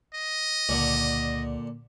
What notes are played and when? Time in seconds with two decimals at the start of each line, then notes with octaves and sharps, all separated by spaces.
0.15 D#5
0.69 C#2 A#2 D3